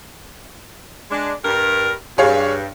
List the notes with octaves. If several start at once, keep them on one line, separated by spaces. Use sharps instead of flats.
G#3 D4
G2 A#4
G2 G#4 C#5 F5